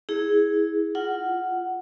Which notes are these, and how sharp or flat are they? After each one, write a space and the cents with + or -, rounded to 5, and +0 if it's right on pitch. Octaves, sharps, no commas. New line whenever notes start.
E4 -20 G#4 +0
F4 -5 F#5 +5